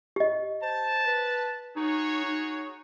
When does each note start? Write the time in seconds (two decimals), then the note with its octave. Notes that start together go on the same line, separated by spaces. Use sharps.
0.16 G4 D#5
0.62 C5 A5
1.07 B4
1.76 D#4 F#4 G#4 C#5
2.24 D#4